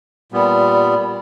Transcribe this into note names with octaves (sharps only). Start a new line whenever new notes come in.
A#2 G3 B3